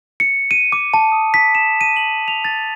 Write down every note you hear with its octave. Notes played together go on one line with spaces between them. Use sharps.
C#7
D#7
D6
A5
D#6
B6
E7
D#7
F#7
F7
A6